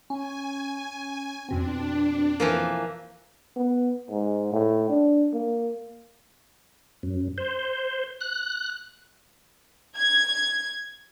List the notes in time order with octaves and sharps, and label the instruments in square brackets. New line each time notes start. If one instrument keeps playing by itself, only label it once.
[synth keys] C#4 [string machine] G#5
[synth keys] F2 B2 C4 [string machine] D4
[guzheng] E3 F3 A#3
[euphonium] B3
G#2
A2
D4
A#3
[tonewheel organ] F#2
C5
F#6
[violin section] G#6